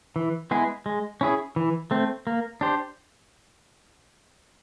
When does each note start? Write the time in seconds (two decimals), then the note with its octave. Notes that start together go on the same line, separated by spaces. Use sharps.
0.16 E3
0.51 G#3 B3 E4 G#4
0.86 G#3
1.21 C#4 E4 G#4
1.56 E3
1.91 A3 C4
2.27 A#3
2.61 D4 G4 C5